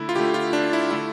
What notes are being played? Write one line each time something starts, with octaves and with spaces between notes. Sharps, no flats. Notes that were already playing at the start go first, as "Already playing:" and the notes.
Already playing: D3 A3 E4
F4
D3 A3 G4
F4
D4
E4
D3 A3 E4